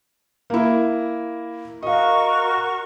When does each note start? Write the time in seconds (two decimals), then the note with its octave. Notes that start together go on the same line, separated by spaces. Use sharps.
0.50 A#3 E4
1.83 F#4 A#4 D#5 F5 C#6